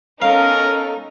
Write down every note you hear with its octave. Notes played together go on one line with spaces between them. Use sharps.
B3 C#4 D#4 A4 A#4 F5